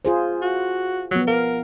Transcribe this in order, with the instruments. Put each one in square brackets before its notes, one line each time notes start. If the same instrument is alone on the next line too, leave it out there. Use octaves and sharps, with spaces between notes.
[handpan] F4 G#4 C5
[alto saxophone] F#4
[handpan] F3 B3 [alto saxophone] F#3
[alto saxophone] A#4 [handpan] F5